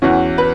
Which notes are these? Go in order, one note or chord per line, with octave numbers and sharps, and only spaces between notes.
E2 E3 C#4 F#4
B4